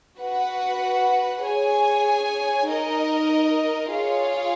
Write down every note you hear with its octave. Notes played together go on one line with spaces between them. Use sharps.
F#4 B4 F#5
G#4 C#5 G#5
D#4 A#4 D#5
F4 G#4 C#5 F5